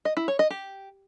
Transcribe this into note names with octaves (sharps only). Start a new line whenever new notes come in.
D#5
E4
C#5
D#5
G4